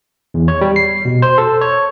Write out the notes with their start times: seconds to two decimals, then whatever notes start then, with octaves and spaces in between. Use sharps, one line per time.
0.34 E2
0.48 C#5
0.61 G3
0.76 C7
1.05 B2
1.22 C5
1.38 A4
1.61 C#5